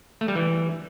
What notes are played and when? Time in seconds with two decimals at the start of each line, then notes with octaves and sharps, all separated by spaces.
0.21 A3
0.28 G3
0.35 E3